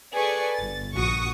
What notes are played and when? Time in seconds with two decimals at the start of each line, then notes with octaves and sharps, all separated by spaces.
0.14 G#4 A4 B4 D5 C#6
0.55 G1 A6
0.94 A#1 F#4 C#6 D#6